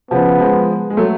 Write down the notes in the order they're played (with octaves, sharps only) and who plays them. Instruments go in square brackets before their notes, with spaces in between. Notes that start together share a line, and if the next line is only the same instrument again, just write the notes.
[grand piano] C#3 F3 [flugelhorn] B3
[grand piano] F3 G#3
G#3
F#3 A3